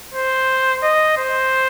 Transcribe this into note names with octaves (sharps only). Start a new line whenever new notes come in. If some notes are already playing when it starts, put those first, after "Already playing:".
C5
D#5
C5